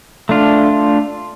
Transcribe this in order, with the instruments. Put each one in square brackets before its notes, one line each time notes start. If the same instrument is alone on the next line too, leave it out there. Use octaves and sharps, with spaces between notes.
[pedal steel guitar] A3 D4 F4